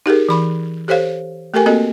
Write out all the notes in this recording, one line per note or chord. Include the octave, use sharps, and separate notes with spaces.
D#4 G4 G#4 A#4
E3 B5 C#6
G4 A4 C5 C#5 F5
A3 G4 A4 A#4 G#5
A#3 C4 F#4 A4 D#5